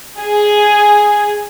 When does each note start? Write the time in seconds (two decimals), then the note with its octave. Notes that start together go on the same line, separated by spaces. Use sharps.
0.19 G#4